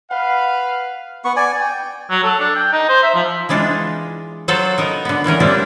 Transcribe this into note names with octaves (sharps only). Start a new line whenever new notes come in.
B4 F5 F#5
B3 C#6
D5 G#5
G5
F#3
A4
D4
G5
D#4
C5
E5
F3
E3 G#3 D4 D#4 F4
F#3 F4 A4 C5
B3 D#4 A#4
D3 B3
A#2 E3 C#4 A#4
G3 A#3 C4 D4 F4 G4